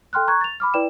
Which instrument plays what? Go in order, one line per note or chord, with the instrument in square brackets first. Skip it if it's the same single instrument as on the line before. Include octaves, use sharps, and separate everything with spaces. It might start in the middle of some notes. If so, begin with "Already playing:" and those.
[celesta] A4 G5 C6 F6 F#6
A#5 C#6 F#6 G#6
A6 F7
B5 D6 F6
E4 B4 D5 G5 E7